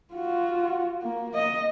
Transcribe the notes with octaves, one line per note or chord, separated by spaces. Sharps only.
F4 F#4
A#3
D#5